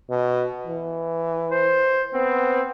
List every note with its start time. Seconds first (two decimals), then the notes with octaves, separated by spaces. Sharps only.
0.10 B2
0.67 E3
1.52 C5
2.14 B3 C4